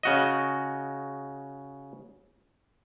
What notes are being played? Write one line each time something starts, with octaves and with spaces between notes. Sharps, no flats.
C#3 F#4 D#5